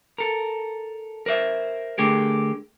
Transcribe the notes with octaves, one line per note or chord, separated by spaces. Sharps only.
A4 A#4
A#4 C5 D5 E5
D3 A3 G4 G#4 A#4